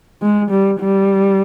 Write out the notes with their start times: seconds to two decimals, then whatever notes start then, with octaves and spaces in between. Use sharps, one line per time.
0.22 G#3
0.50 G3
0.80 G3